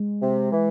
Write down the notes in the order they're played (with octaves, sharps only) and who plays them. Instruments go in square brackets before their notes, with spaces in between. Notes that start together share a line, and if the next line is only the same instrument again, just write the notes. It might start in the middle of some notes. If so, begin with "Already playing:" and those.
Already playing: [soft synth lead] G#3
[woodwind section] C3
E3